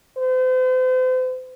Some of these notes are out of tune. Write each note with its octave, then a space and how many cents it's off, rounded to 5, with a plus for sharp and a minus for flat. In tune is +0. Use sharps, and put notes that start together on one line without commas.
C5 -40